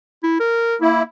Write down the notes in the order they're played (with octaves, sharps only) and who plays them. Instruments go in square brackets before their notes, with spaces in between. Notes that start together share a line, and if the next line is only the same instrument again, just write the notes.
[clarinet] E4
A#4
[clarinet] A#3 [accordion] E4